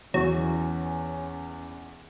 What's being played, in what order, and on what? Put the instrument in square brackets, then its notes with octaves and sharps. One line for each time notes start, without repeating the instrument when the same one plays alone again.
[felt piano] E2 E3 [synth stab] F#3 [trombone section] C#4